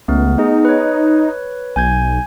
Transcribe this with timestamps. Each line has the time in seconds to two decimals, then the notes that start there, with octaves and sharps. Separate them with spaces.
0.08 C#2 A3 B3
0.38 B3 D#4 G#4
0.65 B4 C#5
1.76 B1 G#5 G6 G#6